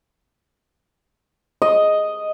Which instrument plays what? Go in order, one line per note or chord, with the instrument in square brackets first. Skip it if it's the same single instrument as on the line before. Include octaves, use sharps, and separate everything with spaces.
[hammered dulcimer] D#5